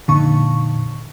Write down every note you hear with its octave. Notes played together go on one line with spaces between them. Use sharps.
F2 A#2 D3 D#4 C#6